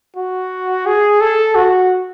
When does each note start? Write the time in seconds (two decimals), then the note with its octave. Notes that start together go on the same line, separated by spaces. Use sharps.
0.16 F#4
0.86 G#4
1.21 A4
1.55 F#4